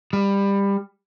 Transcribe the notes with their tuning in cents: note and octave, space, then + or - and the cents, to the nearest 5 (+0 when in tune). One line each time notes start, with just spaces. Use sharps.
G3 +20